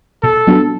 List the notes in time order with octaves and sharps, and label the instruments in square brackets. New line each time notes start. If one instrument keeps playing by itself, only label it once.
[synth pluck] B2 [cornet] A4
[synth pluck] F#3 B3 D4 F#4